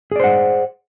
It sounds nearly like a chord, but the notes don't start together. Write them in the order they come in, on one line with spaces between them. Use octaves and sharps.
G#4 D5 C5 F#5